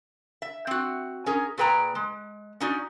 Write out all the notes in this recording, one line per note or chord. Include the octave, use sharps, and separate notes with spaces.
E5
C4 F#4
C#4 G#4 A#4
A#2 G#4 B4 G5 A#5
G#3
C#4 D#4 F#4 D5